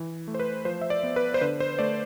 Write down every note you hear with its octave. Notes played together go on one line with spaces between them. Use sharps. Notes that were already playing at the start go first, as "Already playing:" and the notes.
Already playing: E3
A3
C5
B4
F3 C5
E5
D5
B3
B4
C5
D3 B4
C5
A3 D5